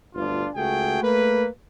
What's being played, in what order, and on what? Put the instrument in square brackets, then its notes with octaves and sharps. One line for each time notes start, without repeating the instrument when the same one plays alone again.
[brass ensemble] G1 D2 D4 F4
C#2 A3 F#4 G#4 G5
A3 A#3 B4